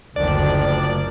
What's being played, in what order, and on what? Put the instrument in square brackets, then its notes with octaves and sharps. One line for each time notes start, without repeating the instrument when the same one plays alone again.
[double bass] F#1 D2 [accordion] D#3 F3 D4 [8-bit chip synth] D5